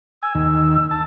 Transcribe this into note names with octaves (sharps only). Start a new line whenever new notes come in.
G#5 E6
D#2 D#3
A5 E6